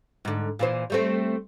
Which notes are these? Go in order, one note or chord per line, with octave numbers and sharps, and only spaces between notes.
G#2 D3
A#2 E3 C5
G3 A3 C4